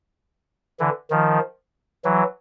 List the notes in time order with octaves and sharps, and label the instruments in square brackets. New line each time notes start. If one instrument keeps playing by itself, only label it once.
[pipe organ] D3 E3
D#3 F3
E3 F#3